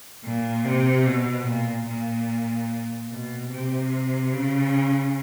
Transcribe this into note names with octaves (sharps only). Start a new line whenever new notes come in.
A#2
C3
B2
A#2
A#2
B2
C3
C#3